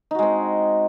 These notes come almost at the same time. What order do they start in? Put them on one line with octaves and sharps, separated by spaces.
D#4 F#4 G#3 C4